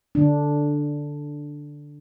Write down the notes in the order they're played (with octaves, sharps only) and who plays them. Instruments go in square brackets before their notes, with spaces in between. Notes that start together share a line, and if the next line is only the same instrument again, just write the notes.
[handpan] D3 D4